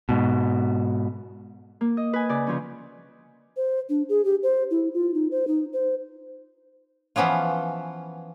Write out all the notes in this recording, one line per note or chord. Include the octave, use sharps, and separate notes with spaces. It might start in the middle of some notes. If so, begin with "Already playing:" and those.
G#2 B2
A#3
D#5
B4 G#5
C#3 D5
C#3 F3 C#4
C5
D4
G#4
G4
C5
E4
F4
D#4
C5
D#4
C5
E3 F3 B3 C#4 F4